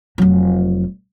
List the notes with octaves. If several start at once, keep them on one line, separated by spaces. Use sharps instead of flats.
F1 F#3